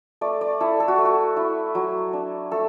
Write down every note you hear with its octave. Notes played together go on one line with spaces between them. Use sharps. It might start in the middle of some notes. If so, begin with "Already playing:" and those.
A3 D5
D5
E4 A4
A4
F#4
A3
F#4
E4
F#3
D4
A3 A4